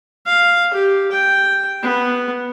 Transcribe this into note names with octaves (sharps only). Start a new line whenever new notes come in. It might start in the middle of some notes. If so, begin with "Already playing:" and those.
F5
G4
G5
B3